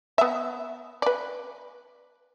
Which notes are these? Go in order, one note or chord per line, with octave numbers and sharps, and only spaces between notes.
B3 E5
B4 D5